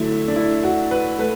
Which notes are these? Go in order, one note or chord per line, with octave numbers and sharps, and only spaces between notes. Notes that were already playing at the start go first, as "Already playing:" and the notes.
Already playing: D3 F#3 A3 E4
D4
E4
F#4
B4
A3 B4